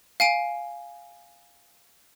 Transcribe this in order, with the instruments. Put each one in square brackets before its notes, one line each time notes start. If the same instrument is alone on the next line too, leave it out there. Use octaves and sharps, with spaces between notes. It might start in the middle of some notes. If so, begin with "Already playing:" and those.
[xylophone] F5 G#5 D7